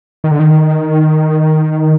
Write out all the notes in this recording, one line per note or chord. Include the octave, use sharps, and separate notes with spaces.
D#3
D3
D#3